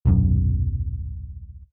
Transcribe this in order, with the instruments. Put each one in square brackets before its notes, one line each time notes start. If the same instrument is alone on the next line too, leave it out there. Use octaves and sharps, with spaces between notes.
[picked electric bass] D#1 B1 F#2